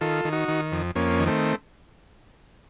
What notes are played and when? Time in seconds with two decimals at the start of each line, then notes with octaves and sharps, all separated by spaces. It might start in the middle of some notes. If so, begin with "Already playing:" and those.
0.01 D#3 F4 A4
0.25 D#3
0.32 D#4 F#4
0.48 D#3
0.72 F2
0.95 F2 A#3 C#4
1.19 D#3
1.27 A3 C4